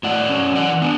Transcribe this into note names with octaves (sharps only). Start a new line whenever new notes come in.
A2 D5 F#5
F#3 C#4
E3 D5 F#5
B3 D4